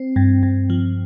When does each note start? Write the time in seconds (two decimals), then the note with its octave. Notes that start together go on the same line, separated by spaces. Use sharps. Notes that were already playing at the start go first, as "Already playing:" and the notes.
Already playing: C4
0.16 G2
0.43 G2
0.70 F3